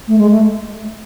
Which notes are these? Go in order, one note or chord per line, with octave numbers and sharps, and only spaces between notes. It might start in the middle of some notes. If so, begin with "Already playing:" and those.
A3
G#3
A3